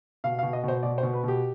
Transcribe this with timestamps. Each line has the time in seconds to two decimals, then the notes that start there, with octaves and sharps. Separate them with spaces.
0.24 B2 F5
0.39 F5
0.43 B2
0.53 D#5
0.64 B2 C5
0.83 B2 D5
0.98 C5
1.03 B2
1.13 B4
1.24 B2 G4